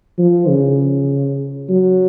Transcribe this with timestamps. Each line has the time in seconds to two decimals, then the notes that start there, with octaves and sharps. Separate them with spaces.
0.18 F3
0.48 C#3
1.69 F#3